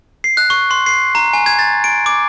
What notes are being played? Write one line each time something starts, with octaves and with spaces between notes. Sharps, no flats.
C7
F#6
C#6
C6
C7
A#5
G#5
G#6
A6
D7
D6